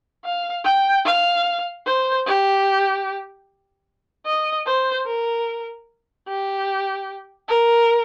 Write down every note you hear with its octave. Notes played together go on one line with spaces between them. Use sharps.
F5
G5
F5
C5
G4
D#5
C5
A#4
G4
A#4